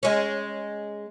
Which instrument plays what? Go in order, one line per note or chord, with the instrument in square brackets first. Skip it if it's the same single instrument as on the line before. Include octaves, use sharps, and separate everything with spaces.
[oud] G#3 C#4